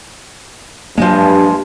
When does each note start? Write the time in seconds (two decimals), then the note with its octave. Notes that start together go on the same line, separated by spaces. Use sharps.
0.98 G2 F3 F#3 G#3 A#3